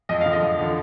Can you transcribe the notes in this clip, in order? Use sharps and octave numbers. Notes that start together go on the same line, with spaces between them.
F2 D#5
F5
D3 F3
D#5
F2
D3 F3